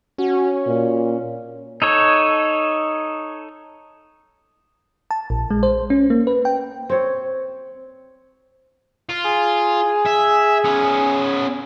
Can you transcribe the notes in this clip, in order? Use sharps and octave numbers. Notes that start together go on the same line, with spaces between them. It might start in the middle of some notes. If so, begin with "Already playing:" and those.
C#4 F#4
A#2
D#4 A4 C#5
A5
A#1
G#3
C5
C#4
A#3
B4
G5
C4 C#5
F4
G#4
E5
B3 C#4